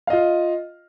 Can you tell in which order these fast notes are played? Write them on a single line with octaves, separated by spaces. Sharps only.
F5 D#5 F4